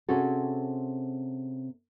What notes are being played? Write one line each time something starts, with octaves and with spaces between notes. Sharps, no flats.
C3 C4 C#4 F#4 G#4 A4